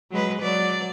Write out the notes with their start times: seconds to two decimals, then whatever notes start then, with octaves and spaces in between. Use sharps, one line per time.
0.11 F#3 G#3 B4
0.42 F#3 D5